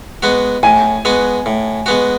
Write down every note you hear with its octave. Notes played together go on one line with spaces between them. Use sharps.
G#3 B3 F#4
A2 G#5
G#3 B3 F#4
A2
G#3 B3 F#4